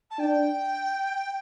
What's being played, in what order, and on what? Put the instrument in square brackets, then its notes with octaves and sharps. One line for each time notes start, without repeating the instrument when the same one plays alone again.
[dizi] A5
[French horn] D4 [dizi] G5